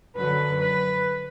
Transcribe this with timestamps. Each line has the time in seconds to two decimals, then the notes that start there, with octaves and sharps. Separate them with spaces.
0.16 F#2 D3 F#3 B4
0.60 B4